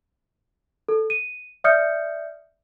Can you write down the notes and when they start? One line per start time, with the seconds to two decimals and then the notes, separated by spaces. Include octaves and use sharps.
0.88 A4
1.10 D#7
1.64 D5 E5 D#6 F6 G6 C#7